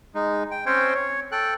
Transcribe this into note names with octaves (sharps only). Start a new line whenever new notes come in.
G#3 D#4
G5
C4 C#4 C5 C#5 G5
C#5
A4 G5 F#6